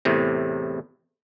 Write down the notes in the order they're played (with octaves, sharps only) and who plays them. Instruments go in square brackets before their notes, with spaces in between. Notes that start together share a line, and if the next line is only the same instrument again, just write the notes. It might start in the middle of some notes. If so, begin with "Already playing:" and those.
[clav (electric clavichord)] E2 A2 C3